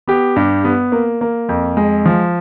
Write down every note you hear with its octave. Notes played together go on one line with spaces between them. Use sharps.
B3 G4
G2
B3
A#3
A#3
F2
G#3
F3